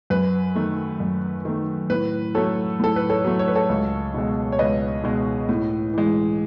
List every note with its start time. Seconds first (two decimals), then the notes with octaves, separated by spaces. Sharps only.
0.10 F#2 B4
0.55 D#3 A3
1.00 F#2
1.45 D#3 A3
1.90 A2 B4
2.35 F#3 A3 A4 C#5
2.80 A2 A4
2.96 B4
3.10 A4 C#5
3.25 F#3 A3
3.39 C#5
3.48 B4
3.55 A4 C#5
3.69 C#2
4.14 B2 G#3
4.52 C#5
4.59 C#2 B4 D#5
5.03 B2 G#3
5.49 A2
5.93 E3 G#3